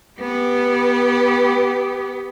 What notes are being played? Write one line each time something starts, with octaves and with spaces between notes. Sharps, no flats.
B3 G4